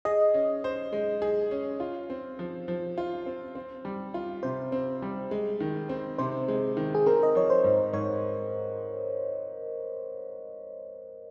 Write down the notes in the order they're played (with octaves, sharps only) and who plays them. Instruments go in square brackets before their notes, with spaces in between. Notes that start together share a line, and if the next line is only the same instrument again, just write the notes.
[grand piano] G#4 [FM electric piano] D#5
[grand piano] C#4
C5
G#3
G#4
C#4
F4
C4
F3
F3
F4
C4
C4
G3
F4
[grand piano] C3 [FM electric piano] C5
[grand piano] C4
G3
G#3
D#3
C4
[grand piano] C3 [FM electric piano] C5
[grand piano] G#3
D#3
[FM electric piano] G#4
[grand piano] C4 [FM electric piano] A#4
[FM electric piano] D#5
[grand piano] F3 [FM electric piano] C#5
[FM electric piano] C5
[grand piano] G#2
[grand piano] G#2 [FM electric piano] C#5